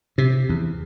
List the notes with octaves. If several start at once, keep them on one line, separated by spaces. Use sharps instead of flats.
C3
E2